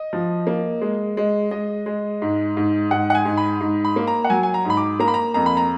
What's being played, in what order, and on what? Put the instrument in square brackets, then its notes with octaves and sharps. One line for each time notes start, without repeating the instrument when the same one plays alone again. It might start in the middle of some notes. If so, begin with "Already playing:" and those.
Already playing: [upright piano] D#5
F3
A#3
G#3
G#3
G#3 D#5
G#3
G#2
G#2
G#2 F#5
F#5
G#5
G#2
B5
G#2
B5
A#3
A#5
F#5
F#3 G#5
G#5
A#5
G#2 B5
D6
A#3 A#5
B5
A#5
F2 A#5
B5
A#5